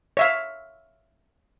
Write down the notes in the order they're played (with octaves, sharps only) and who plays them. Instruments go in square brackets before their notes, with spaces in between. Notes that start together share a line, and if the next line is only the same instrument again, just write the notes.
[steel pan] C#5 E5 F5